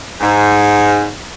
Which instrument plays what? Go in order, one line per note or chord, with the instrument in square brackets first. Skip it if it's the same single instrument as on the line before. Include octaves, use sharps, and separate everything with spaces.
[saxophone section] G#2